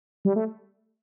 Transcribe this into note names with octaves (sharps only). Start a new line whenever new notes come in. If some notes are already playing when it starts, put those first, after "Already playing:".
G3
A3